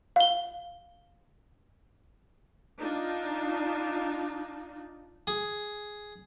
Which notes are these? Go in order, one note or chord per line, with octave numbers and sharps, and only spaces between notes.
F5 G7
D4 D#4 F4
G#4